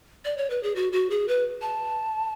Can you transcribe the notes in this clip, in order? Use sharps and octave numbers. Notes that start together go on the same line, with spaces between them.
D5
C#5
B4
G#4
F#4
F#4
G#4
B4
A5